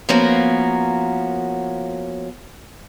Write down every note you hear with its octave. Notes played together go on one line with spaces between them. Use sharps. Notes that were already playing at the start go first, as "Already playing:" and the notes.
F3 A#3 B3 C#4 F#4 A#4